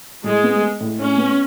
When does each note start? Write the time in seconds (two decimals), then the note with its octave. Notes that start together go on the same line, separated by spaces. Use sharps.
0.24 A2 G#3
0.43 B3
0.62 G#3
0.80 A2
1.00 A2 C#4
1.18 B3